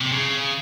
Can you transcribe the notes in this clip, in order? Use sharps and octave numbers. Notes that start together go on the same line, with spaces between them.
C3
C#3